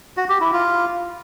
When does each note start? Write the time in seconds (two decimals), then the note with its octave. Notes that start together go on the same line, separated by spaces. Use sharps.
0.17 F#4
0.29 G4
0.41 E4
0.53 F4